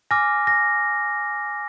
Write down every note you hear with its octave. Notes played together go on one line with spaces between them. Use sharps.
G#5 D6 F6 A#6
A#6